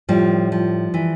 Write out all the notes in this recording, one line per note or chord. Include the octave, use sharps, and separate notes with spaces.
A2 F3 G3
F3
E3